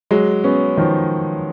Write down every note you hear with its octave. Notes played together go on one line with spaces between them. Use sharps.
F#3 G#3
B3 C#4
D#3 F3